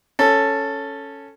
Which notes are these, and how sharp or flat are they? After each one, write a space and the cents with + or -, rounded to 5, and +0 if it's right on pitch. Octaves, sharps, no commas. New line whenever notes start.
C#4 +0 A4 +5